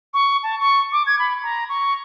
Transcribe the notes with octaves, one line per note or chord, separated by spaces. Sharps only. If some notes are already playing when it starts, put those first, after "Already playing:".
C#6
A5
C#6
D6
G#6
B5
A#5
C#6